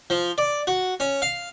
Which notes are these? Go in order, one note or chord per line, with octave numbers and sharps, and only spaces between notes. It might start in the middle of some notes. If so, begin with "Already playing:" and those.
F3
D5
F#4
C#4
F5